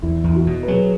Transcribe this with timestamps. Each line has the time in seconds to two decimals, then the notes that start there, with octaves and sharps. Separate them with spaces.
0.02 E2 E4
0.24 E2
0.29 E4
0.35 F#4
0.47 B2
0.63 B4
0.68 F#3 G#4